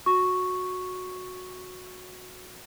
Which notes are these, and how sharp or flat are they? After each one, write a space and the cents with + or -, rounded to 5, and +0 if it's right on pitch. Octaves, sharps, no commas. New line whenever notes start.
F#4 -15 C#6 +0